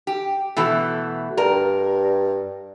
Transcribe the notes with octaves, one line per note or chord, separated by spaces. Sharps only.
G4
B2 E3 A3
G2 A#4